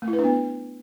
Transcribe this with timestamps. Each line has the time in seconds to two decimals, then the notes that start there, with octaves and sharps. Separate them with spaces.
0.02 A3
0.08 E4
0.13 B4
0.19 D4
0.24 B3